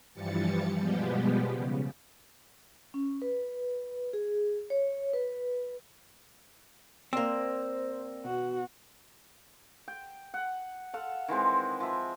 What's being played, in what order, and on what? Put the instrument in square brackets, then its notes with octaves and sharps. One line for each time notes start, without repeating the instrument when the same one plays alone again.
[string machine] G2 E3 F3 G3 A6 C#7
B2 F3 G3 G#3 B3 G4
C#3
[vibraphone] C#4
B4
G#4
C#5
B4
[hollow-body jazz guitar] A#3 C4 [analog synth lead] C5 [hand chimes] D5 E6
[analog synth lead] B2 [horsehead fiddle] F#4
[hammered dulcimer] G5
F#5
A4 F5 F#5
D#3 E3 G#3 C4
F3 E5